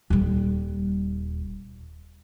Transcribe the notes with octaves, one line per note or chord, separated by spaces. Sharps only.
D#1 G3